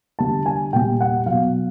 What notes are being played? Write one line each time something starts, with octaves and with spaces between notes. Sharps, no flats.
D3 G3 A5
G#5
A#2 G3 G5
F#5
B2 F#3 F5